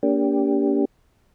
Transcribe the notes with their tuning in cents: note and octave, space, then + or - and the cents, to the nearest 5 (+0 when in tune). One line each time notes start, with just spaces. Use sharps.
A#3 +0 D4 -40 G4 +0